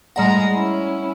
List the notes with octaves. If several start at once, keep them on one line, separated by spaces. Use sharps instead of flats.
A2 G3 G#3 D5 F#5 A#5
C#4 E4